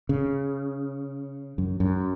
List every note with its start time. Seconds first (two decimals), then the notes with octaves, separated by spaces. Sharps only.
0.09 C#3
1.58 F#2
1.80 F#2